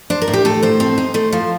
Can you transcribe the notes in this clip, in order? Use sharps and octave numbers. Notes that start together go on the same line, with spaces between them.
D4 C5
A#4
A2
G4
A3 A4
A2 C5
C4
D#4
A3 C5
F3 C5